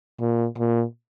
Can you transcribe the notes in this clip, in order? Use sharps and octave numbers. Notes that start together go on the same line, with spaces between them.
A#2
A#2